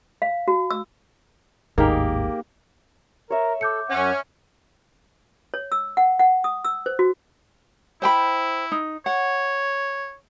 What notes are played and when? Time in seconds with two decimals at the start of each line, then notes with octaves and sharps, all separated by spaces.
0.22 F5
0.48 F#4
0.71 E6
1.78 G#1 D#2 A2 A#3 D#4 G4 G#4 A#4
3.30 A#4 C#5 E5
3.61 A4 D6 G6 C#7
3.90 F#2 C#4 F#5
5.54 C#5
5.72 E6
5.97 F#5
6.19 F#5
6.44 D#6
6.64 E6
6.86 C5
6.99 F#4
8.02 E4 C5 G5 B5
8.72 D#4
9.06 C#5 F#5